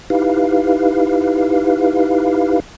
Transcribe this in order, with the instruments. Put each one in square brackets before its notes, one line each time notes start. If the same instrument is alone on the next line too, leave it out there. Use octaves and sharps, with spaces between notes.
[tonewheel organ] D#4 E4 G4 B4 F5